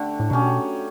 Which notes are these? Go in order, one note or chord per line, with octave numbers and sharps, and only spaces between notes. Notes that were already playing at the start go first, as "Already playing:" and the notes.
Already playing: D3 A3 G4
A2
B2 F#3 C#4 G4